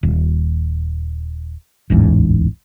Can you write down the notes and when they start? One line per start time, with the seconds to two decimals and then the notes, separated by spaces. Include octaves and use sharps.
0.03 D#1
1.90 D1 A1 E2 G#2